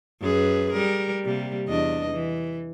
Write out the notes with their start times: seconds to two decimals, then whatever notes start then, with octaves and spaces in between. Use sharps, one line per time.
0.22 F#2 G#4 B4
0.73 G3 A#4
1.25 C3 G3 A#3
1.68 E2 D4 D#5
2.12 E3